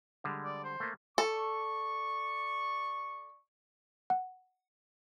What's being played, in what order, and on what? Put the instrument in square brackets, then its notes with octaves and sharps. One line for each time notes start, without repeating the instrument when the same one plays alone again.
[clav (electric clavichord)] D3 G3 G#3
[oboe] D5
C5
[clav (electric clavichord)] A3 A#3
[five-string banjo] A4 [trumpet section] D5 C#6
[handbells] F#5